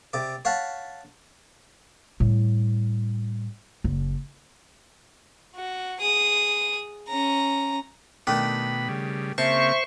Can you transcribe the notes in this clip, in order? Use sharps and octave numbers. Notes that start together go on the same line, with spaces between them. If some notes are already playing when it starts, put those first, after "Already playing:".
C3 D5
C#5 F5 F#5 A5 B5
A2 G3
F#1
F#4
G#4 D#6
C#4 A#5
B2 D#3 A3 D4 B5
C#3 G3
C#3 A#3 C4 C5 E5 A5 C#6